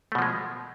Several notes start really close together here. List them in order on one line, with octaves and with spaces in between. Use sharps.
A3 B2 F3 G#3